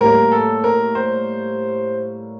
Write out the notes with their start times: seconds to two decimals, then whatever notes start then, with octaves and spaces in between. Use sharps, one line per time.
0.01 A2 G3 A#3 A#4
0.32 A4
0.64 A#4
0.95 C5